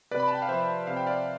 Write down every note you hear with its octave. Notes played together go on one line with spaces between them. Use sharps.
C3 B4 D5
B5
A5
G5
F5
F3 C5 E5
C3 F5
G5
D5 F5